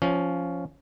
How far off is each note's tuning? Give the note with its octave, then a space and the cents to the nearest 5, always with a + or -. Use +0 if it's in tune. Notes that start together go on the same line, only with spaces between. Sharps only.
F3 +0 C#4 +10